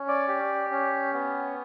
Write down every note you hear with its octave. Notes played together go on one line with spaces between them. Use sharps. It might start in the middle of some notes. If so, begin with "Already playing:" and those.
Already playing: C#4
D5
G4
C#4
B3